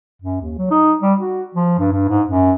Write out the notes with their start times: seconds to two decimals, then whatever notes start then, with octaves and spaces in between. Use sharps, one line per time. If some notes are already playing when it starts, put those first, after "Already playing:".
0.22 F#2
0.41 D#2
0.58 F#3
0.71 D#4
1.02 G3
1.20 F#4
1.55 F3
1.79 G2
1.92 G2
2.08 G#2
2.28 F#2